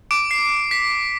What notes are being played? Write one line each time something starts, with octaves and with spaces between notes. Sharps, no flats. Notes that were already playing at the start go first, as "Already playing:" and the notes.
D6 D7
C7
B6